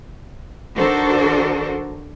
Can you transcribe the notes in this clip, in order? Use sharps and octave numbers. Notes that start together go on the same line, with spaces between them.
D#3 D4 F#4 A4 A#4 C5